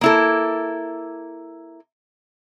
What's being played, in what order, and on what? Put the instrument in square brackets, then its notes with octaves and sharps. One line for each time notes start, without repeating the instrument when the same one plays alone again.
[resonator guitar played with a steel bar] A#3 E4 A4